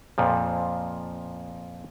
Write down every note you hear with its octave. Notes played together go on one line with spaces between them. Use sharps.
F2 A#2 F3